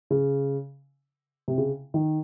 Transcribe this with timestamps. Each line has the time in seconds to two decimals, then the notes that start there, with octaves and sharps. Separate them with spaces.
0.11 C#3
1.48 C3
1.58 C#3
1.94 D#3